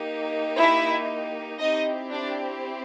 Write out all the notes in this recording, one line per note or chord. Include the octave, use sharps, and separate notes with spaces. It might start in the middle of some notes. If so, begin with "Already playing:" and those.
Already playing: A#3 D#4 G4
E4 E5
C4 D#4 E4 G4 D#5
D4 D5